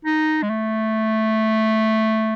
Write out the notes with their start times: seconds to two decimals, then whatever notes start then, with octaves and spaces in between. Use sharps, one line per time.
0.05 D#4
0.43 G#3
0.50 A3